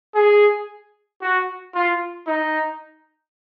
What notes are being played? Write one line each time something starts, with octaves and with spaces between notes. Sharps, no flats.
G#4
F#4
F4
D#4